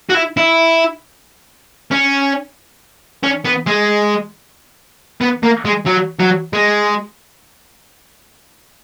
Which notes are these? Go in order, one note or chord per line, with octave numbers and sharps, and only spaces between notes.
F#4
E4
E4
C#4
C#4
B3
G#3
B3
A#3
G#3
F#3
F#3
G#3